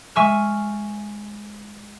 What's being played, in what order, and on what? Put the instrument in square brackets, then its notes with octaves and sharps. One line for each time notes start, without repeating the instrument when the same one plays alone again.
[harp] G#3 E5 G#5 C#6 E6 F6